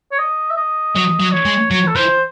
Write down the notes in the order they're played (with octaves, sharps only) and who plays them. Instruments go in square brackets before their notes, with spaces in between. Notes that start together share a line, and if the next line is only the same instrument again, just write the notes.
[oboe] C#5
D#5
E5
D#5
[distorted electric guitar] F#3 [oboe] D#5
[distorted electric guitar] F#3
[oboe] C#5
[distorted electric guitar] G#3
[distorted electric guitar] F#3 [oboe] C#5
[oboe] A4
[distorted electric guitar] E3 [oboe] C5